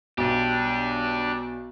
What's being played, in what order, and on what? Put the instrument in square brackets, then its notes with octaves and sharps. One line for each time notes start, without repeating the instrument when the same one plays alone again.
[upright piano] B1 [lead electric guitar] D4 G4